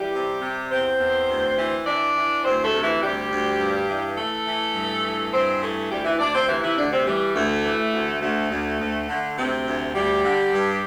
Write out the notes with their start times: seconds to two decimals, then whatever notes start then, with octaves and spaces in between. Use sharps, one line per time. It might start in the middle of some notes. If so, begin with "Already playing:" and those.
Already playing: E3 G3 G4
0.13 C3
0.41 C3
0.70 E2 C4 C5
0.99 E2
1.28 D2
1.57 E3
1.86 E3 D4 D5
2.15 E3
2.43 D2 C4 C5
2.63 A3 A4
2.72 C3
2.82 E3 E4
3.01 D2 G3 G4
3.30 D2
3.59 G2
3.88 E3
4.17 E3 A3 A4
4.46 E3
4.75 G2
5.03 E3
5.32 G2 C4 C5
5.61 E3 A3 A4
5.90 D2 G3 G4
6.04 E3 E4
6.19 D2 D4 D5
6.33 C4 C5
6.48 C3 E3 E4
6.62 E3 E4
6.77 D2 D3 D4
6.92 C3 C4
7.05 E3 G3
7.34 D2 A3
7.63 E3
7.92 D2
8.21 D2 A3
8.50 D2
8.79 D2
9.08 D3
9.36 D2 C3 C4
9.65 D2
9.94 D2 G3 G4
10.23 D3
10.52 G2